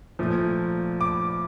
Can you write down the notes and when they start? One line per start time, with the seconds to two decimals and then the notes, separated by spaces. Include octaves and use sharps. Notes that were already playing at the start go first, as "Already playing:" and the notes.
0.19 A#2 F3 A3
1.01 D6